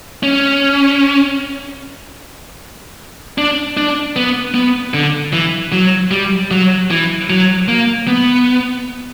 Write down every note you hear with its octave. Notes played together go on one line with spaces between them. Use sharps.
C#4
D4
D4
B3
B3
D3
E3
F#3
G3
F#3
E3
F#3
A#3
B3